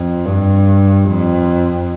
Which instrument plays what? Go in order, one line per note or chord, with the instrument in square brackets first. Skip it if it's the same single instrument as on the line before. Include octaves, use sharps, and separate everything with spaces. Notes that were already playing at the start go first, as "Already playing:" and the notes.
Already playing: [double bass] F2
G2
F2